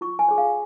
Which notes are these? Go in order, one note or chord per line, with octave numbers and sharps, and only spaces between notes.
F4 C#6
G#5
G#4 C#5
F5